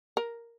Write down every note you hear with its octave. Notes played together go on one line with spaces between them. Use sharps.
A#4